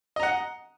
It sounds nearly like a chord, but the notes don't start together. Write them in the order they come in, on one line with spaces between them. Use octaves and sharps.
D#5 A#5 F#5